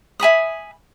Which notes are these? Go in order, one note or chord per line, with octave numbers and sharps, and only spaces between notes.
E5 G#5 B5 D#6